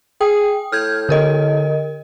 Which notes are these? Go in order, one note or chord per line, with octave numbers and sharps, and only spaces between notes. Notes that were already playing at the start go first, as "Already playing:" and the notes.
G#4 G5 D#6
A2 F6 G6 G#6
D3 A#4 D#5